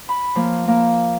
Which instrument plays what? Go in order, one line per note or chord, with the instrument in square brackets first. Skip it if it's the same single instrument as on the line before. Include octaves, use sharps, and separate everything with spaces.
[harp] B5
F3 A#3
A#3